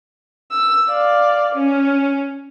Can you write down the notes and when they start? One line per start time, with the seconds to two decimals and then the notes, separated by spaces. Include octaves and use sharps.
0.51 E6
0.88 D5 F5
1.55 C#4